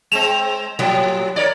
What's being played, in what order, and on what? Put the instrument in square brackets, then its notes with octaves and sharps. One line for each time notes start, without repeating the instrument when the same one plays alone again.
[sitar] G#3 C4 [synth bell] E7 F7
[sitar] A2 [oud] F#3 G3
[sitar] A#4 C#5 D5